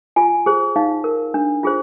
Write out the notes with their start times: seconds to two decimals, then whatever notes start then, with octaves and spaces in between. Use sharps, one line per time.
0.16 F4 G#5
0.46 G#4 C5
0.76 D#4 F5
1.04 A#4
1.34 D4
1.63 F4 G#4 C5